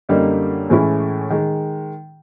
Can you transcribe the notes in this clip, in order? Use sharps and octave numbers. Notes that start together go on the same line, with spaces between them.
F#2 D3 G3 A#3 D#4
A2 E3 G#3 C#4 E4
D#3 G#3